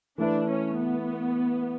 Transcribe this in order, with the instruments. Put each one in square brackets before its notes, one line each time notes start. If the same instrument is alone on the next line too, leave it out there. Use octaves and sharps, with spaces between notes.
[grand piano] E3 A3 E4 B4 [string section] D4
[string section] C#4
B3